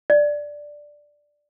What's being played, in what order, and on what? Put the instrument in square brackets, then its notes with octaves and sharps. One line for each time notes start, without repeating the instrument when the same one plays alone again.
[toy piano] D5